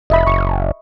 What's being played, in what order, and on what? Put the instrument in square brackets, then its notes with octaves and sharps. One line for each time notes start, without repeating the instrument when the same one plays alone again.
[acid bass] F1 [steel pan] D#5 E5 B5
[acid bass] F#1 [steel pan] C#6